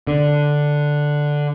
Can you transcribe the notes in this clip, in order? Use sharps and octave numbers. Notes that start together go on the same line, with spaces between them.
D3